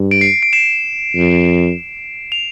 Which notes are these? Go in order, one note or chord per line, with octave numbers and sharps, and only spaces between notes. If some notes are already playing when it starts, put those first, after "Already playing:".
Already playing: G2
D7
C7
D7
C7 E7
F2
F7